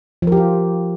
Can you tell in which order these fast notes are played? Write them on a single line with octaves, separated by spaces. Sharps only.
F3 A#4 G4 F4